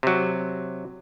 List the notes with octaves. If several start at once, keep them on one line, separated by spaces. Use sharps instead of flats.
C3 F#3